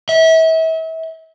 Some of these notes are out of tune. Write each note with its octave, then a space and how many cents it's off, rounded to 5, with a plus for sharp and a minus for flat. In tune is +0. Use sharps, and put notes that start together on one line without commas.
E5 -35